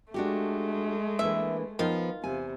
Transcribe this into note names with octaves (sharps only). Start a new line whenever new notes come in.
G#3 A3 D4 F#4 G4
E3 A#3 D4 E5
D#3 F3 B3 F4
E2 C3 G#5